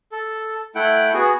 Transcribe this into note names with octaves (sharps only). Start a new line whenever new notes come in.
A4
A3 E4 F#5 G5
B3 F#4 G#4